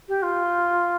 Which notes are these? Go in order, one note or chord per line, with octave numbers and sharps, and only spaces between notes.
G4
F4